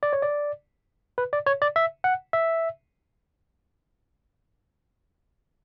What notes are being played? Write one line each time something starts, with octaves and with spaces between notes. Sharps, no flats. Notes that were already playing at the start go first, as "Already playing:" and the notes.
D5
C#5
D5
B4
D5
C#5
D5
E5
F#5
E5